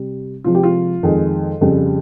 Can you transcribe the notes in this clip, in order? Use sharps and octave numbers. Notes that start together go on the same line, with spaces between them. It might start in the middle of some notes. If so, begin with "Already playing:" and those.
Already playing: C3 G3
C3 F3 G#3 F4
G4
F4
F2 D#3 G#3
F2 C#3 G3